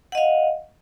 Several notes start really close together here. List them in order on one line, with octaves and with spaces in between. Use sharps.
F#5 D#5 F5